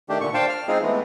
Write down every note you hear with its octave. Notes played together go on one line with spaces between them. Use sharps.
D#3 A3 D4 G4
A#2 D3 C#6
D4 C5 F5 G5 A5
F6
G#3 C4 D#4 F4 G#4
E3 G#3 A3 B3